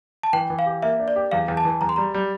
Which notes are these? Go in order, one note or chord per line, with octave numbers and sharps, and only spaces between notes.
A5
E3 G5
E3
F5
G4
A#3 E5
D4
D5
G4
E2 F5
E2
A5
E3
E2 A#5
C6
G3 A#5
G3